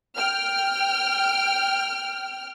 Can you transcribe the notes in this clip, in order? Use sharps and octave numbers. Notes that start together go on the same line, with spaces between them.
G5 F6